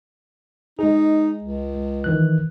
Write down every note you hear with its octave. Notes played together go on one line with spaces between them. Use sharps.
G#3 D#4 G#4
C#2
D#3 E3 F#6